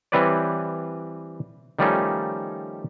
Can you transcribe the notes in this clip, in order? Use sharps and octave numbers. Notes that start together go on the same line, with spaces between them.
E3 G3 C4 B4 C#5 D5
D#3 F3 G3 A3 C#4 D#4